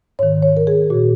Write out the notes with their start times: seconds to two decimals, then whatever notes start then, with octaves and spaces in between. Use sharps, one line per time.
0.19 G#2 D#3 C#5
0.43 C#5
0.57 A#4
0.67 G#4
0.90 A#2 F#4